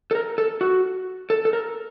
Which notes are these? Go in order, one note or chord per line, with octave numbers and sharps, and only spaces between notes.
A4
A#4
A4
F#4
A4
A4
A#4